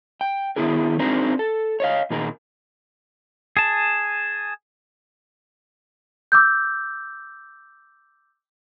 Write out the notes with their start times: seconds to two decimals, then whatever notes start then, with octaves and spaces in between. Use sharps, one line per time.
0.21 G5
0.56 D#3 F#3 B3 E4 G#4 A#4
0.99 C4 D4 D#4 G#4 A#4 C5
1.39 A4
1.80 C#5 D#5 F5
2.10 A#2 D#3 G#4 A#4
3.57 G#4 A5
6.32 D6 E6 G6